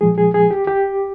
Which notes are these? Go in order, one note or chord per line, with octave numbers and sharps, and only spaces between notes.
A#2 F3 G#3 G#4
G#4
G#4
G4
G4